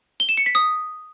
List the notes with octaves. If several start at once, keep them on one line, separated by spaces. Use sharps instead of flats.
G7
E7
C#7
B6
D#6